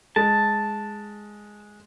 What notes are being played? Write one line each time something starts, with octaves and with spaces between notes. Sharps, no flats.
G#3 A5